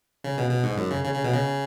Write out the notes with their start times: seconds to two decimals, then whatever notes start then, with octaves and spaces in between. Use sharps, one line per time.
0.24 C#3
0.38 B2
0.50 B2
0.64 G#2
0.77 F#2
0.91 C#3
1.04 C#3
1.14 C#3
1.24 B2
1.33 C#3